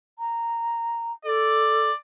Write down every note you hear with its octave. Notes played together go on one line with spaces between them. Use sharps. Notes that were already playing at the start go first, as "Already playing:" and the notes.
A#5
A4 D5